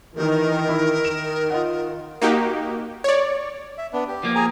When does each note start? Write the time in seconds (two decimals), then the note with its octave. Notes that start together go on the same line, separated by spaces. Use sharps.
0.16 D#3 E3 A#4
0.69 E4
1.05 D#3 E7
1.50 F4 D#5 F#5
2.22 A#3 D#4 F#4 G4
3.04 C#5 D5
3.78 E5
3.93 B3 D4
4.07 G4
4.23 F3 A#3
4.35 G#4 G#5 A#5